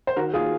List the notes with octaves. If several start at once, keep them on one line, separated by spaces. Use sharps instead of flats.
C5
D#3 F#4 A#4
A#3 F4 G#4